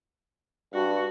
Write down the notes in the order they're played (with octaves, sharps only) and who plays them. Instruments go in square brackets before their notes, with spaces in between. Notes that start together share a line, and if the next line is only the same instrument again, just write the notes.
[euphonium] G2 [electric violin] F#4